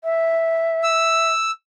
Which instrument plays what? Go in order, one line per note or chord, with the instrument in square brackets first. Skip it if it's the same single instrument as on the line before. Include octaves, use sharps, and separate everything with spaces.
[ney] E5
[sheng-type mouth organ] E6